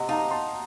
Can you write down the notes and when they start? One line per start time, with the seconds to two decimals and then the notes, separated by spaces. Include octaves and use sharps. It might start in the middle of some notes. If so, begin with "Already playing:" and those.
Already playing: C3 D#5 F#5
0.09 D#4 F5 A5
0.31 A5 C6